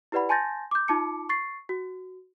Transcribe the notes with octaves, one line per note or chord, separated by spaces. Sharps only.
E4 G4 B4 D5 F#5 B5
G#5 A5 C6 G6 A6 A#6
D6 G6
D#4 F4 A5 D6 C#7
C#6 A6 C7
F#4